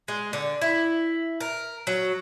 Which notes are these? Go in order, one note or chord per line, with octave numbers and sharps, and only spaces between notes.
G#3
D3
E4
A#4
F#3